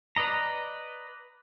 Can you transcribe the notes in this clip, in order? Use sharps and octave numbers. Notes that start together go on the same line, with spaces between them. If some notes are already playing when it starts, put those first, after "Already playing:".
B4 D5 D#5 A#5